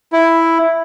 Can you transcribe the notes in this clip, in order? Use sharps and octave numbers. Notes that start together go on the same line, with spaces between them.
E4